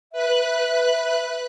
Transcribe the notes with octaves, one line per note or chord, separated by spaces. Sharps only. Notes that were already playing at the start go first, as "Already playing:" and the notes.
B4 E5 F#6